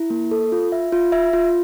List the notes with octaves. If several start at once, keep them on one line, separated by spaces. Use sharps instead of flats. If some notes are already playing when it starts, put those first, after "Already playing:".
Already playing: E4
A#3
A4
F4
E5
F4
E5
F4